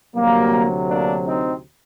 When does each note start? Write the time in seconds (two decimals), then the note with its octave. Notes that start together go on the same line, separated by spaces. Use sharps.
0.15 D2 C3 F#3 G3 A#3
0.89 A#3 D4
1.26 C4 D#4